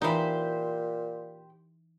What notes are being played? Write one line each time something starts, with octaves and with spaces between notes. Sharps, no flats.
A#2 E3 D#4 G4 C5 B5